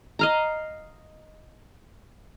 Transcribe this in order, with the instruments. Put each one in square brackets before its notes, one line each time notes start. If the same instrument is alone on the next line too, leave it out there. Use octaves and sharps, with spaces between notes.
[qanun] D#5 F5 A#5